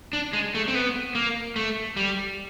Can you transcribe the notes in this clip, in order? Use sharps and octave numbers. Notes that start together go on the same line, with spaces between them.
D4
G#3
A3
C4
B3
A#3
A3
G3